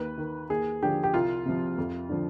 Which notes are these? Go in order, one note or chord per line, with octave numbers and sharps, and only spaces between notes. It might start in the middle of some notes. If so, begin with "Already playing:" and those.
Already playing: D#2 B4
D#3
D#2 G#4
D3 F3 G4
G4
C2 F4
C3 F3
F2
D3 F3